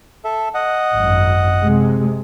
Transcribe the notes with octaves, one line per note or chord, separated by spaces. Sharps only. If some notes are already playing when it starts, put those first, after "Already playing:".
A4 E5
D#5 F#5
G#1 F#2
C3 G#3